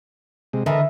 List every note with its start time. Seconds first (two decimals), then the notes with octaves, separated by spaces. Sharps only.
0.53 C3 G#3
0.66 D3 E3 A4 A#4 D#5